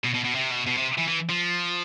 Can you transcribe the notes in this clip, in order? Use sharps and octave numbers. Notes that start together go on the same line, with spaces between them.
B2
B2
B2
C3
B2
B2
C3
E3
E3
F3